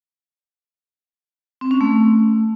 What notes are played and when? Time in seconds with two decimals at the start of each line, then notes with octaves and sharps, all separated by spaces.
1.61 C4
1.71 C#4
1.81 A3